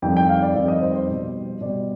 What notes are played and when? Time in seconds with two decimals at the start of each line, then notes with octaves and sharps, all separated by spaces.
0.02 F2 D#3 G3 G5
0.17 G5
0.29 F5
0.42 D5
0.55 F2 D#3 G3 D5
0.68 D#5
0.82 C5
0.95 C5
1.08 B2 G3
1.61 B2 G3 D5